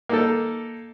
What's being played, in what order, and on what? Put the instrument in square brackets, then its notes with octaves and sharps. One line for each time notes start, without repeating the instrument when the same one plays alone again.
[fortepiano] A#3 D#4 A4